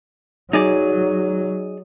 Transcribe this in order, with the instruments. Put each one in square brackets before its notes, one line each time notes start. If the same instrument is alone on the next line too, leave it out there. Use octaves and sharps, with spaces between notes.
[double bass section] F#3 [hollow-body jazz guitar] D#4 G#4 D5